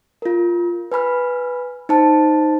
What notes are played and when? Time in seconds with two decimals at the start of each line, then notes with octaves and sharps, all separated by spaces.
0.22 F4 A#4
0.92 B4 G#5 B5 F6
1.89 D#4 C5 A5